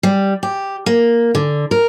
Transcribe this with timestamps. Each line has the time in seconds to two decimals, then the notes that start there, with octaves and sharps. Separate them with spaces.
0.03 G3
0.43 G4
0.86 A#3
1.35 D3
1.71 A#4